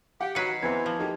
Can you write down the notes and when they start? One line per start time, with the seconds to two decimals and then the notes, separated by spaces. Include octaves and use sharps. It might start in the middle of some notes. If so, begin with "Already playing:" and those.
0.21 G4 F#5
0.35 D#3 F#3 B4 A#5 C7 C#7
0.63 E2 E3 C4 G#6
0.86 F3
0.99 F#3 A3 A#3 D#4 G4